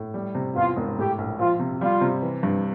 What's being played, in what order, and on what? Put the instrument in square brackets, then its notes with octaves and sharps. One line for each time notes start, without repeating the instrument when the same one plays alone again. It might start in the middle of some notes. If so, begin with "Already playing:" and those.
Already playing: [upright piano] A2
G3
C3
[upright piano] E2 [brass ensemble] F4
[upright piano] E1
[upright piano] A2 [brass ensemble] G4
[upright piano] A#1
[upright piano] F3 [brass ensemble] F4
[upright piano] C3
[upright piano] G3 [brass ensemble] F4
[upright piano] C3
E3
G2